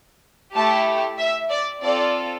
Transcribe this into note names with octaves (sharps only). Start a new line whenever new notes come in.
A3 E4 G4 A5
E5
D5
C4 F4 A4 D5